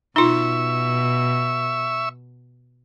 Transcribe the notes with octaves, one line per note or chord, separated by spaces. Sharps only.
B2 D#4 F4 E5 C#6 E6